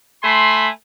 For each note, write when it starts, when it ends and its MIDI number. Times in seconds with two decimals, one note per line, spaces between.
0.22 0.67 57
0.22 0.67 80
0.22 0.67 83
0.22 0.67 84